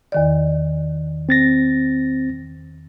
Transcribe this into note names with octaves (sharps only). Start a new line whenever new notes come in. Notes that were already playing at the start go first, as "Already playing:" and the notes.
E2 D#3 D5
C4 A6 A#6